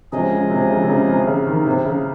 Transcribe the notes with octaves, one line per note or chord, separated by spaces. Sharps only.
C3 F3 G#3 C#4 G#4 D#5
C#3
C3
C#3
C3
C#3
C3
C#3
D#3
C3
C#3